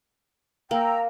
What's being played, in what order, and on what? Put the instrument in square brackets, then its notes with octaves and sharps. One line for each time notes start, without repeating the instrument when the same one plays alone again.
[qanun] A#3 [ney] G5 [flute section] A#5 E6